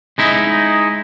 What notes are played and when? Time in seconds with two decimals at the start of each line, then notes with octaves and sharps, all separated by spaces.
0.18 G#3 D#4 E4